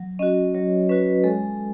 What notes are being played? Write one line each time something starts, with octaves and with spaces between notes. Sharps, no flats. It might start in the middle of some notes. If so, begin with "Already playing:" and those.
Already playing: F#3
C#4 F#4 D#5
F#3 C#5
C#4 F#4 B4
B4
G#3 A4